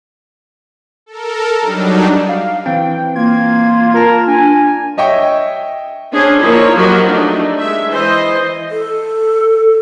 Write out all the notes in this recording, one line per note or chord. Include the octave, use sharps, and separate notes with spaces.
A4 A#4
F#3 G3 D4 D#4
F5
E3 C4 G5
A#3 F4 G#6
F4 A#4 A5
D4 G#5
C#5 D#5 E5 G5 C#6
C#4 D4 G#4 C5
F3 A#3 D#4 E4 C#5
F3 F#3 F#4 G4 A#4 D#5
A3 D4 D#4
G#3 E5
E3 C5 D#5
A4